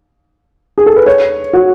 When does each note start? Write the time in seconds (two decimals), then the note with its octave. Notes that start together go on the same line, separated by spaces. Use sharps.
0.78 G#4
0.86 A4
0.96 B4
1.06 C#5
1.53 F#4